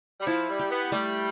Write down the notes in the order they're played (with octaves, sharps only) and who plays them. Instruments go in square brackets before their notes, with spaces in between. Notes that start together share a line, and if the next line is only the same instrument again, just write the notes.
[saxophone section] G3
[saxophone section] F3 [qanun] E4
[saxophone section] G3
[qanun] G4
[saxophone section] B3
[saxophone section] G3 [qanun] A3